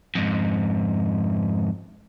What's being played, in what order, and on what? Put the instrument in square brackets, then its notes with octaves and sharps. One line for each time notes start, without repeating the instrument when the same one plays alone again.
[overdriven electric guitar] F2 G#2